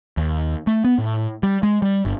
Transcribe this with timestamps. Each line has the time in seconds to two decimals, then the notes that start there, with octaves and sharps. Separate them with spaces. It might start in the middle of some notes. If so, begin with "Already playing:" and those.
0.17 D#2
0.67 A3
0.84 B3
0.98 A2
1.43 G3
1.63 G#3
1.82 G3
2.05 G1